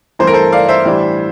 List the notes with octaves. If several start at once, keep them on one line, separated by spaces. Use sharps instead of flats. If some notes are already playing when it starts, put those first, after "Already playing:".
G2 E3 A3 C4 C5
A#4
A4 C5
D5 F5
C5 E5
A2 E3 G3 D4